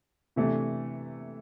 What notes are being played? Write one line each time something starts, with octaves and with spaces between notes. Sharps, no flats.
C3 E3 A3 D4